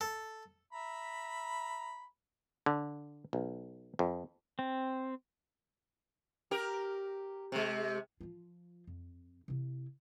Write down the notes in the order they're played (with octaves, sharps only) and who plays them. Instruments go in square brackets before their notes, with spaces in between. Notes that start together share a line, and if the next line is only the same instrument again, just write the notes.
[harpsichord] A4
[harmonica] E5 A#5 B5
[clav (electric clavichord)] D3
B1
F2
[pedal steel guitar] C4
[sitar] G4 A#4
C3 G#3
[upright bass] F3 F4
F2
C3 E4